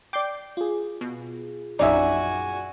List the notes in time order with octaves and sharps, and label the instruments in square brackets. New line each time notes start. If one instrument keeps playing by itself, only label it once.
[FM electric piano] D5 G5 [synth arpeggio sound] D6 G6 C7
[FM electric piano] F4 G#4
[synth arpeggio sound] B2
[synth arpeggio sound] A#1 F#2 D#4 [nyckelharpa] F#4 G#5 [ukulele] D5 E5